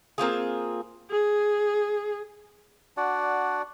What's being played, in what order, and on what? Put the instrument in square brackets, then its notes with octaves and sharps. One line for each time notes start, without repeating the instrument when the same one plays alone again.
[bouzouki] A#3 C4 F4 G#4
[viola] G#4
[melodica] D4 F#4 D5 F#5